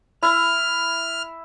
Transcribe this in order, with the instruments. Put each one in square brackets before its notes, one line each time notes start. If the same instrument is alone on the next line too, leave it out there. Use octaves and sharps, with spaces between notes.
[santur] E4 [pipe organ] F6